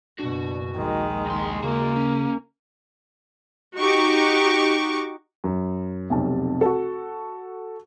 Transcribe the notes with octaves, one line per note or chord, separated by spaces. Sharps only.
F#1 B2 D4 F#4
A#1 D#2 D#3 G#3
C2 C6
C#3 A#3 C#4 F#4
C#4
D#4 F#4 G4 C#6 D6
F#2
F1 B1 C3 A5
F#4 A4